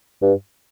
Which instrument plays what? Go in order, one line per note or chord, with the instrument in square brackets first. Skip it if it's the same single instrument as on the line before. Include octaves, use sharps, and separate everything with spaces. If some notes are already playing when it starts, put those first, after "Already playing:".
[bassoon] G2